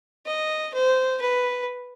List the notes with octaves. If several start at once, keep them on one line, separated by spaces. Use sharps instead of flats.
D#5
C5
B4